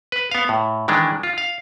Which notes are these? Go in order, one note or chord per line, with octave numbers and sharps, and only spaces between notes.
B4
B3 F5
A2
D#3 E3 G#3 D4
F4
F5